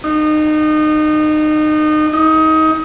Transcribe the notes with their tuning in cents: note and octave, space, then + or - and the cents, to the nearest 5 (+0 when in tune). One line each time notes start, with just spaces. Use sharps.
D#4 -30
D#4 +20